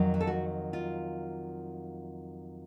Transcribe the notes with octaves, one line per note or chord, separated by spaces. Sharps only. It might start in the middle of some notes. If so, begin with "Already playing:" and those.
Already playing: F2 D#3 F#3
F#4
A4
F#4
F4